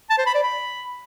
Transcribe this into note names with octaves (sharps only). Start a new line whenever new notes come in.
A5
C5
B5
D5
B5